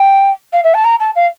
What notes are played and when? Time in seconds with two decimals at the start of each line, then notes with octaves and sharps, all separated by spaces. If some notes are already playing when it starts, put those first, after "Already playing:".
Already playing: G5
0.52 F5
0.63 E5
0.74 A5
0.84 A#5
0.99 A5
1.15 F5